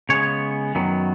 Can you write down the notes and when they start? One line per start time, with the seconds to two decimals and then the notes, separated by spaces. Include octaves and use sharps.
0.09 C#3 G#3 B3 C#5
0.75 F#2 D#3 F#3 B3